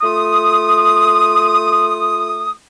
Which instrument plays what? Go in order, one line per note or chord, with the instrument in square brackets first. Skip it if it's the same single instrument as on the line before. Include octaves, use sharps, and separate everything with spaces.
[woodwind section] A3 F4 D#6